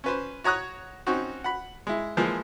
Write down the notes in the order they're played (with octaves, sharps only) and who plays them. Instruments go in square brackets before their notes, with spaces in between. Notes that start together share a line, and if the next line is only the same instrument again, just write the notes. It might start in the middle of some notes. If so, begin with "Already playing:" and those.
[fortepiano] C#4 B4 C5
F#4 C#5 A#5 D#6 F#6
C4 C#4 D#4 F#4
F#5 B5
G#3 E4
E3 F3 G#3 A#3 F4